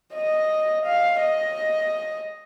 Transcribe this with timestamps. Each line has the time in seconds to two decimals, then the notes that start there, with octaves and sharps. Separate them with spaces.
0.14 D#5
0.86 F5
1.21 D#5